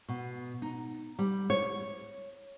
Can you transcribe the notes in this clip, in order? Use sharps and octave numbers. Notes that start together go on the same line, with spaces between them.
B2
D#4
G3
C#5